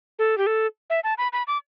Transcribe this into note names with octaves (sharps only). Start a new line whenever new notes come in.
A4
G4
A4
E5
A5
B5
B5
D6